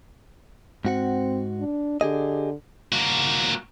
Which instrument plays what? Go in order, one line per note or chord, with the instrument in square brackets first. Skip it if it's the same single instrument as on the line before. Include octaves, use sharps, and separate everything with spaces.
[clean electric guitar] G#2 F#4 F#5 [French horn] C4
[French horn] D4
[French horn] D3 [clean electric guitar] G4 G#4 D#5
[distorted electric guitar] A#3 F#4